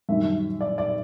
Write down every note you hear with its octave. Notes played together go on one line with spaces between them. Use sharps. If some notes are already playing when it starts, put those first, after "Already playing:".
F#2 D#3 G3 E5
D5
D5